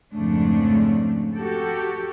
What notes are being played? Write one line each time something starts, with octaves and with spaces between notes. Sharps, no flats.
F2 G#2 C#3 F3 A3 D4
F#4 G4 A4